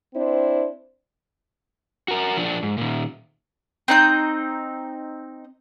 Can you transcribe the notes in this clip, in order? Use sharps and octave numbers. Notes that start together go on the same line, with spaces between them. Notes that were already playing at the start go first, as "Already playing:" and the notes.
C4 D4 E4 C5
F#4 A#4
F3 D4
G#2
A#2 D#3
C4 D#4 G6